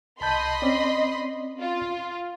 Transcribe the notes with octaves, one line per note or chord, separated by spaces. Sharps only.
C2 D#5 A5 B5 C6 G6
C4 C#4 D5
F4